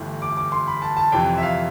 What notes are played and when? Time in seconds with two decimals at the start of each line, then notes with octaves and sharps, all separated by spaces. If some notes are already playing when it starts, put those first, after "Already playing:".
Already playing: G1 G2 E3 A3
0.22 D6
0.37 D6
0.52 C6
0.67 B5
0.82 A5
0.97 A5
1.12 F2 C3 E3 G5
1.38 E5
1.43 F5